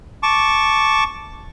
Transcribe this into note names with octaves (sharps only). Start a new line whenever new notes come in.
A5 C#6 D6